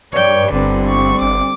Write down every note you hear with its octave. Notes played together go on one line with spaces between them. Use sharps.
G2 B4 C#5 D5 G5
G1 D3 G3 C4
C#6
G1 D6